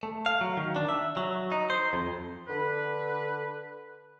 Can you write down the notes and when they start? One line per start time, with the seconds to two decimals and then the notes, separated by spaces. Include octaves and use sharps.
0.03 A3
0.26 F5
0.41 F#3
0.57 D#3
0.76 D4
0.89 E5
1.17 F#3
1.52 D#4
1.70 C5
1.93 F2
2.48 D3 B4